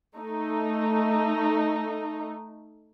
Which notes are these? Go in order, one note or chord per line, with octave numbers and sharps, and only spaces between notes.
A3 D#4